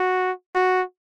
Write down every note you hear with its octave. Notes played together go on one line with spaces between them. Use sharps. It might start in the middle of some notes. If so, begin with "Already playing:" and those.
Already playing: F#4
F#4